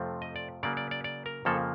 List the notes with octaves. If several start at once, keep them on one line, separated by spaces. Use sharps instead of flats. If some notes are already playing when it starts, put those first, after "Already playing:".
Already playing: F2 C3 F3 A3 C4
D#5
D5
C#3 F#3 A#3 D5
D5
D5
D5
A#4
F2 C#3 F3 A#3 A4